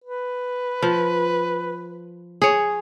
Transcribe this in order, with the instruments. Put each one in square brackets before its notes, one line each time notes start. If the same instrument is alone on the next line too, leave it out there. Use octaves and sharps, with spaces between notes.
[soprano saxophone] B4
[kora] F3
G#4 C#5